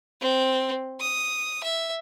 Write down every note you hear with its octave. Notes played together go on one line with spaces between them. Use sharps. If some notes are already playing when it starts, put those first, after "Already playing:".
C4
D#6
E5